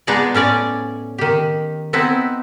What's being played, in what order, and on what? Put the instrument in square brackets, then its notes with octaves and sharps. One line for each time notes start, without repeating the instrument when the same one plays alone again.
[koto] G#3 B3 D4 D#4 G#4 D5
A2 C#4 D5 G#5
D#3 G4
B3 C4 D#4 E4